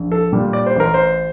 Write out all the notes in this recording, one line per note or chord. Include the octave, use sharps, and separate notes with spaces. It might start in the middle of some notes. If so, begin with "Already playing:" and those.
Already playing: A#1
A4
A#2 G3
D5
C5
A1 A#4
C5